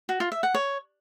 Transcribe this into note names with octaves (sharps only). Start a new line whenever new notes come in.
F#4
F4
E5
F#5
C#5